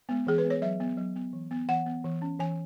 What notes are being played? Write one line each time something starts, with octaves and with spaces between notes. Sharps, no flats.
G#3 B3
E3 G#4
B4
G#3 B3
C#5
F#3 E5
B3
F#3
B3
E3
B3
E3 F#5
B3
E3
C#4
E3 G#5